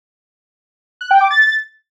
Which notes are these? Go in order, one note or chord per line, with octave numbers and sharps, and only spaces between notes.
F#6
G5
D6
A6